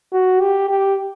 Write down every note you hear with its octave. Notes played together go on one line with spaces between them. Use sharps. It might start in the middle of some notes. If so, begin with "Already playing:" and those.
F#4
G4
G4